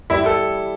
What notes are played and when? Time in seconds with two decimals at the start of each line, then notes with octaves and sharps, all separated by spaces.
0.10 G3 E4 E5
0.26 A4